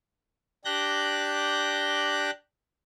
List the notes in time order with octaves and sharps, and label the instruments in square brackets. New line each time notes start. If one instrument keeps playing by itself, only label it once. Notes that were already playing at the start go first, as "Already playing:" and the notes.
[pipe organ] D4 G4 F#6 G6 A#6